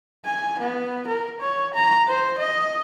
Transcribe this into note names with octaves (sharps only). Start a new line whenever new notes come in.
G#5
B3
A#4
C#5
A#5
C5
D#5